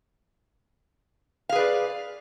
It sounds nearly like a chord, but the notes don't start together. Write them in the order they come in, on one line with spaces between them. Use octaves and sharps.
F5 G#4 B4 D5